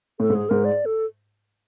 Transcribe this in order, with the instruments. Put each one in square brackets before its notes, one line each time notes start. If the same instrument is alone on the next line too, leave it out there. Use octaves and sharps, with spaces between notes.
[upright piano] A2 [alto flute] A4
[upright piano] G#2
[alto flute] G#4
[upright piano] G#2 [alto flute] A#4
[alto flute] D5
A4